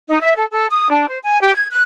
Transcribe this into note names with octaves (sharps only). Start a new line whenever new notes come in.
D#4
E5
A4
A4
D#6
D4
C5
G#5
G4
G#6
F#6